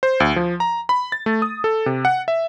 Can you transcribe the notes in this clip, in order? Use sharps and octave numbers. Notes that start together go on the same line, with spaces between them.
C5
D2
F3
A#5
B5
A6
A3
D#6
A4
C3
F#5
E5